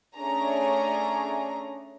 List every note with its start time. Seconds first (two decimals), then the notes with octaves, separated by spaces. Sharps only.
0.16 A3 C#4 D4 G#4 A#5